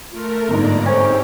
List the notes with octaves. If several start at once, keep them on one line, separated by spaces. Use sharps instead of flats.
A3 F4 A#4
G1 G#2 A#3 D5 A#5
C4 C#4 G4 C5